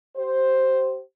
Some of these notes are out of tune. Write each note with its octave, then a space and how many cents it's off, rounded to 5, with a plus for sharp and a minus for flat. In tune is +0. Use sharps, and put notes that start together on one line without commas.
G4 -35 C5 +5